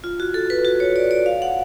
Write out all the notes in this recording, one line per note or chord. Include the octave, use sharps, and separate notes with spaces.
F4
F#4
A4
B4
F#4
C#5
D5
D5
F5
F#5